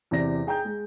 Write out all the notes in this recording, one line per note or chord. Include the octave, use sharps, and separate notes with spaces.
E2 C3 D5 A#6
G#4 G5 A#5 G6
G#3